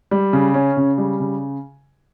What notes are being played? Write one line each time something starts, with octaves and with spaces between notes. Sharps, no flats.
G3
C#3
C#4
C#3
G3
C#3